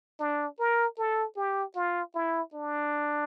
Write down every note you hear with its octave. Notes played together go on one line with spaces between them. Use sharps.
D4
A#4
A4
G4
F4
E4
D4